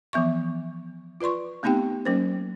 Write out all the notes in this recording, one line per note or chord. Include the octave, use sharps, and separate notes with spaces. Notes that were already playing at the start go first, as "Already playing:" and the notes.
E3 F3 B3 E5 C#6
F4 B4 D5 C6 C#6
A3 B3 C4 D#4 G4 G5
F#3 A#3 C#4 A#4 C5